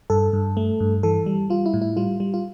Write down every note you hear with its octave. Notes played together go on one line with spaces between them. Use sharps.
G2 A4
G2
A3
G2
E3 A4
G3
G3 F4
E4
A2
E4
G3 F4
G3
F4